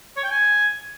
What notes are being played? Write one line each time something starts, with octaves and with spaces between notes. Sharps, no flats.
C#5
G5
G#5